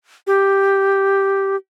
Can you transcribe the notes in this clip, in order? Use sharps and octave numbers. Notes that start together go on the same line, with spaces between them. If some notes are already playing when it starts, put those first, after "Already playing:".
G4